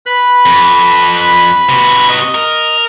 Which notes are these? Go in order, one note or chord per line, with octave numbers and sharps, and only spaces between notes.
B4 B5 F#6
F2
C3 F#4
D#5
A#4